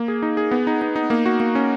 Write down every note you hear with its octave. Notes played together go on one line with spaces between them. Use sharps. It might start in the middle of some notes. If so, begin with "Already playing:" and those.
Already playing: A#3
G#4
D#4
G#4
B3
D#4
D#4
D#4
A#3
F#4
A#3
C#4